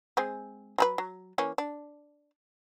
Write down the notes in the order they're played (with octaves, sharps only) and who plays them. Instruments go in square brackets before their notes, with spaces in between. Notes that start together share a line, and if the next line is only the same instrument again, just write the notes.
[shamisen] G#3 C4 G#4
F#3 G#4 B4
F#3
E3 A#3 C#4
D4